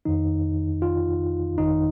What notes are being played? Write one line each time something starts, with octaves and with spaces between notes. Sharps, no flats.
F2 D#3 D#4
F4
G1 F2 D#3 D#4